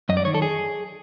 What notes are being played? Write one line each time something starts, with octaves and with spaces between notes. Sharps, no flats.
F#2 D#5
D5
D#3 C#5
A4
G#4